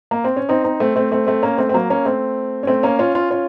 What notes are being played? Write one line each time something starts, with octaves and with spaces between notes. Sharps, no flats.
A#3
C4
C#4
C4 D#4
C4 D#4
A3 C4
A3 C4
A3 C4
A3 C4
A#3 C#4
A3 C4
C4
F#3 A#3
A#3 C#4
A3 C4
C#4
A3 C4
A#3 C#4
C#4 F4
C#4 F4
C#4 F4